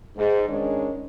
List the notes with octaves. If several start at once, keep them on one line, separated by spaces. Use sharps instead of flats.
G#2
D#3 G#3 C#4 D4 C#5 D#5